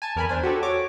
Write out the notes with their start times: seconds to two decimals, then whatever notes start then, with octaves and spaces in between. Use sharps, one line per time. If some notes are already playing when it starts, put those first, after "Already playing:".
0.02 G#5 A5
0.16 E2 A#4 G#5 B5
0.29 D4 C5 G#5
0.43 F#4 G4 A4
0.63 C#5 D6 G#6